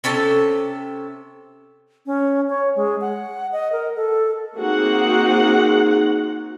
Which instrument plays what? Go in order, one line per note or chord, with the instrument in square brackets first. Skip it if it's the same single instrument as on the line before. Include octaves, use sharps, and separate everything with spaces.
[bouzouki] C3 C#4 A4 A5
[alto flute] C#4
C#5
G#3
F#5
D#5
A#4
A4
[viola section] A#3 C4 D#4 F#4 G#4 F#5